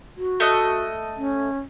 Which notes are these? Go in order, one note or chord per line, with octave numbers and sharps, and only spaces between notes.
F#4
A3 D#5 F#6
C#4